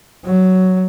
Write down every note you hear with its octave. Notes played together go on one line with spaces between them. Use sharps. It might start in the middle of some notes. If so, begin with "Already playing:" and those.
F#3